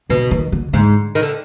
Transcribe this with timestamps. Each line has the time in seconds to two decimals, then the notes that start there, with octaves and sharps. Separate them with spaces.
0.10 B2 D3
0.31 D#3
0.52 D3
0.73 G#2 D3
1.15 D#3
1.22 D3